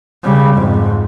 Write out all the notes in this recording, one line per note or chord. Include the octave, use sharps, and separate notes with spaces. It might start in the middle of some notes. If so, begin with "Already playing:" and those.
C#3 G3
F2 G#2